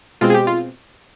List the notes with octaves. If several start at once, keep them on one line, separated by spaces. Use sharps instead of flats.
B2 G#3 C4 F4
G#4
G4
F4